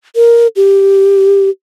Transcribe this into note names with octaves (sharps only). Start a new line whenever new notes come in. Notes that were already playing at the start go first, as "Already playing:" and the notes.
A#4
G4